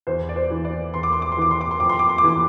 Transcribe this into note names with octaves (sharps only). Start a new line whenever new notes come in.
E2 C5
D5
C5
E3
D5
E2 C6
D6
C6
D6
C6
E3 D6
C6
D6
C6
F2 D6
C6
D6
C6
D6
E3
C6